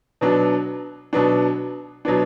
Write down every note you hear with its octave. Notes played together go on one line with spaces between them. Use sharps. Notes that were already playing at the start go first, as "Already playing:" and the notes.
B2 F#3 B3 D4
B2 F#3 B3 D4
B2 F#3 B3 D4